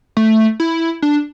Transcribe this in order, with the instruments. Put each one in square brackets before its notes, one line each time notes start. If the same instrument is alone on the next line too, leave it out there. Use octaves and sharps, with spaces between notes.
[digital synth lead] A3
E4
D4